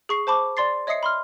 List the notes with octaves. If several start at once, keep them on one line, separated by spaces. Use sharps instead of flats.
G#4 C#6 C7
C5 A5 B5 D6
D5 C6 A6 C7
C#5 D#5 E5 D#6 C7 C#7
B5 C6 F6